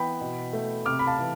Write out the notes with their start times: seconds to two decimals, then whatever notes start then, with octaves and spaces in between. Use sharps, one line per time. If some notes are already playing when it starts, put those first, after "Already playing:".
Already playing: E3 B3 G5 B5
0.21 B2
0.53 A3
0.85 C3 D6 F6
0.99 B5
1.07 F5 A5
1.18 E3